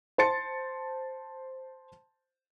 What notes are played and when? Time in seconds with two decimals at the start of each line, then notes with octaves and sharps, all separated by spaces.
0.18 C5 A5 C6 A6 C#7